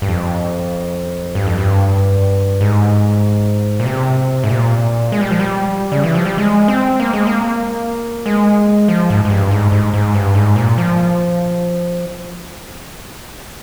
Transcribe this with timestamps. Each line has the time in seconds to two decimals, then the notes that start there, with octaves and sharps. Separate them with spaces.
0.02 G2
0.08 F2
1.35 G2
1.46 F2
1.58 G2
2.61 G#2
3.80 A#2
3.86 C3
4.44 G#2
4.49 A#2
5.12 G#3
5.21 G3
5.31 F3
5.40 G3
5.92 C#3
6.04 E3
6.15 F3
6.25 G3
6.38 G#3
6.68 C4
7.00 A#3
7.13 G#3
7.27 A#3
8.26 G#3
8.88 F3
9.10 G#2
9.25 G#2
9.30 G2
9.51 G#2
9.72 G#2
9.94 G#2
10.14 G2
10.35 G#2
10.56 A#2
10.78 F3